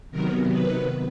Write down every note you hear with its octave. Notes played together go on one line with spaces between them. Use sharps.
C3 D#3 F#3 B3 A#4
B4